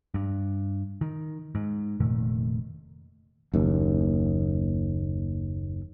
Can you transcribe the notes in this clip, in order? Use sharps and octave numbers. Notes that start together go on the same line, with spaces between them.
G2
D#3
G#2
F1 A#2 D#3 A3
F#1 D#2